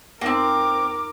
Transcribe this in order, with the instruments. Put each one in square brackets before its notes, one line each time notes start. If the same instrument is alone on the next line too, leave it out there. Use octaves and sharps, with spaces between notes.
[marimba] F2 D#4 [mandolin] A#3 C4 [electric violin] A#4 D6